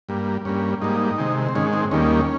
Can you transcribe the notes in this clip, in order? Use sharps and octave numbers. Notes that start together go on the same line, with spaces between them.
G2 G3 A#3
G2 G3 A#3 C#4
G#2 G3 A#3 D#4
C3 D#3 G#3
C4
G#2 D#3 G#3 C#4
C4
D#2 D#3 G3 A#3 C#4